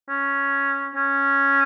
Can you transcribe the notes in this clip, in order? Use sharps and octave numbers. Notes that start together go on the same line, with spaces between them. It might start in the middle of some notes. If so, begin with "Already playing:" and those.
C#4
C#4